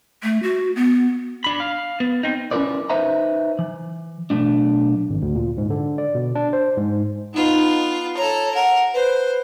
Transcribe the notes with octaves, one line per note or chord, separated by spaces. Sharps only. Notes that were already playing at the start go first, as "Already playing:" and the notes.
A3
F#4
B3
D4 B5
F5
B3
C4 D#4
C#4 E4 F4 A#4 B4 D5
D#4 B4 C5 E5 A#5
E3
B1 A3 D4
G#1
D2
A#2
G#2
D3
D5
B2
D4
C5
G#2
B3 D#4 F4
A4 C#5 A#5
A#4 F#5
B4 C5